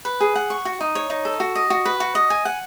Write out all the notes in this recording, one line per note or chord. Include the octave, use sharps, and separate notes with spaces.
B4
G#4
F#5
C#6
F#4
D#4
C#5
D#4
A4
F#4
D#5
F#4
B4
F#4
D#5
G#5
F#5